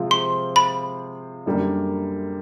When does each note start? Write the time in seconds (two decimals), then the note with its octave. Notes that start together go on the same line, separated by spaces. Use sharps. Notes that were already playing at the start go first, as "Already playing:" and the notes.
Already playing: C3 F3 G#3 C4 F4
0.11 C6
0.56 B5
1.46 F#2 D3 G3 A#3